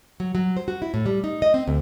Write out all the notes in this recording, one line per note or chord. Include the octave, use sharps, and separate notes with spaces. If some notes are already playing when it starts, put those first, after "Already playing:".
F#3
F#3
C5
F#4
E4
A2
G3
D#4
D#5
C4
D2